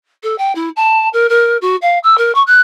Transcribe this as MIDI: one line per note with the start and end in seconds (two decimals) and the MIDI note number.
0.23 0.37 69
0.38 0.52 79
0.55 0.69 64
0.76 1.08 81
1.13 1.29 70
1.29 1.57 70
1.61 1.76 66
1.82 1.98 77
2.03 2.17 88
2.18 2.32 70
2.35 2.42 85
2.47 2.61 90